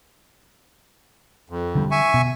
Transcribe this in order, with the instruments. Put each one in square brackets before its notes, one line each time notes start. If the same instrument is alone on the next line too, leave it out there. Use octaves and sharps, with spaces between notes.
[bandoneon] F2
[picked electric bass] D3 G3
[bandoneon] E5 G#5 C#6
[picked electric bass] B2